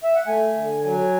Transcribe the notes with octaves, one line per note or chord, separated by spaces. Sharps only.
E5
F#5
A3 G#5
D3
F#3 G#5